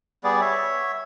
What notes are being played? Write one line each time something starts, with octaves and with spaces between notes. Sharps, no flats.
G3 B3 G#4 D5
C#5 E5